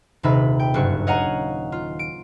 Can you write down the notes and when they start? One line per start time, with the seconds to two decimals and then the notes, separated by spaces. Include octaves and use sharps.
0.23 D#1 C3 D#3 D#4 E5 B5
0.60 G5
0.74 F#1 G2 F#4 C#6
1.07 C#5 D#5 F5 F#5 G#5 A#5
1.72 F4
1.99 D7